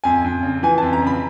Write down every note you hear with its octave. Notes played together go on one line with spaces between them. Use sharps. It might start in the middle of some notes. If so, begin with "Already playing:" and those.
F2 G#5
F2
C#3
E3 G#5
A5
F2
A#5
C#3 B5